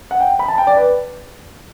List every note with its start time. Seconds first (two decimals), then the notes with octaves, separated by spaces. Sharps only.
0.11 F#5
0.20 G5
0.39 B5
0.48 A5
0.58 G5
0.67 D5
0.77 B4